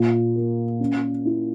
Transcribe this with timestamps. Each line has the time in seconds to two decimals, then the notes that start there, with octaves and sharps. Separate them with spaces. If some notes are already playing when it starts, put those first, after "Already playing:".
Already playing: A#2
0.36 A#3
0.80 C#4
1.25 E4